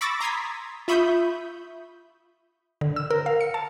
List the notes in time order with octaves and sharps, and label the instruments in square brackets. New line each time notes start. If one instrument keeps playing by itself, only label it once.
[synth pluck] B5 C#6 D6 E6 A6 A#6
A#5 C6 D#6 G#6 B6
F4 E5 B5 C#6 D#6 G6
[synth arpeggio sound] D3
E6
A#4
F5
C#7
A5